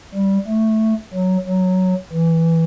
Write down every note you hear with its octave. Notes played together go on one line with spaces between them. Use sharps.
G3
A3
F#3
F#3
E3